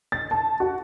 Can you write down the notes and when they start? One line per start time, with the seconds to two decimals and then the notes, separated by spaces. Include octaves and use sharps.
0.12 A6
0.31 A5
0.60 F#4